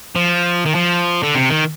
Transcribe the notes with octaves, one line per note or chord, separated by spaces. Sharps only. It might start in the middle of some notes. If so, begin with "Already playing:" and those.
F3
D#3
F3
D3
C3
D#3